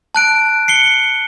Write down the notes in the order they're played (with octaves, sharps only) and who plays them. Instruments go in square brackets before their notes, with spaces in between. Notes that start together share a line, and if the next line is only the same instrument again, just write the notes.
[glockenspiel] A5 F#6 D7
C7 C#7 G7